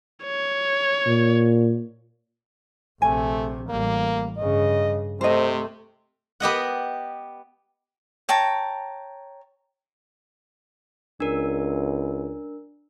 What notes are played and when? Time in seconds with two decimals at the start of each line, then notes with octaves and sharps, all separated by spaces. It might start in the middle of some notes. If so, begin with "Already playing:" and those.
0.24 C#5
1.07 A#2
3.02 A#1 C3 A3 G#5
3.69 A1 G3 A#3
4.37 G2 C#3 D#5
5.21 C3 A3 C5 D#5
6.40 B3 G4 D#5 F#5
8.29 C#5 G5 A5 A#5
11.20 C#2 D4 A#4